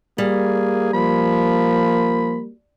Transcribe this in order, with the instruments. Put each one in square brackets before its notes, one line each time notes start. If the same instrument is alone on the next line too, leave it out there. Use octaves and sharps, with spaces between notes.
[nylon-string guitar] G3 [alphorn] A#3 [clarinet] G#4
[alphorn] F3 [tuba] A#3 [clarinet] B5